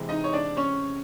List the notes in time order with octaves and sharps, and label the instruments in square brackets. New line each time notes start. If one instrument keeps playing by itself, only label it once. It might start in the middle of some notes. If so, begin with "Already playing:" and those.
Already playing: [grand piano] C3 E3 G#3
D#4 D#5
C#5
D4 D5
C#4 C#5